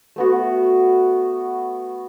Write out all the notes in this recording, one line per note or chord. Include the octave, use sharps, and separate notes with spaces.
A3 B3 F#4